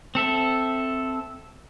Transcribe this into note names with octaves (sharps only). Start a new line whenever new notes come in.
C4 A4 E5